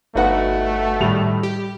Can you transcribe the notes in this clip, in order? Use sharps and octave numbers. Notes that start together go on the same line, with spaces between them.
G1 A3 D#4 F#4 B4 F#5
A2 D#3 G3 B5 F7
G4